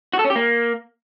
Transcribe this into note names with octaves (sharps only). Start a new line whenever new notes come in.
F#4
A4
C#4
G4
A#3